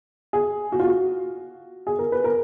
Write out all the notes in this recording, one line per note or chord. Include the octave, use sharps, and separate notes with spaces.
G#4
F#4
F4
F#4
G#4
A#4
B4
A#4